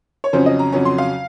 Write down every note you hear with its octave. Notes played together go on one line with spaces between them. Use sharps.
C#5
F2 C#3 F#3 C#4 C5
D#5
A#5
F2 C#3 F#3 C#4
C6
F5